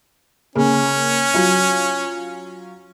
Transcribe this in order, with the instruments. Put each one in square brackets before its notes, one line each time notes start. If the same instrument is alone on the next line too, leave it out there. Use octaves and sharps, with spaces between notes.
[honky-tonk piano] C#3 A#3 [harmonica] C#4
[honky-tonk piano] F#3 F4